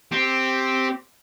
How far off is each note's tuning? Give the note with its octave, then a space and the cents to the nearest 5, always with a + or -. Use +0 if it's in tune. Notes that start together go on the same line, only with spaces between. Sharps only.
C4 +0 G4 +0